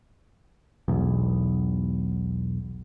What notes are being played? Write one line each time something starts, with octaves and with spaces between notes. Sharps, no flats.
E1 B1 E2